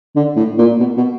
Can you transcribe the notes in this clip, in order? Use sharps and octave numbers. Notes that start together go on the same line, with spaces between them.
D3
A2
A#2
B2
B2